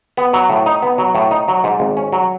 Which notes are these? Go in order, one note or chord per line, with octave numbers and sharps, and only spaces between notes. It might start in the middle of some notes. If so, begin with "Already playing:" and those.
B3
F#3
A2
D#4
B3
F#3
A2
D#4
F#3
G#2
G#1
C#4
F#3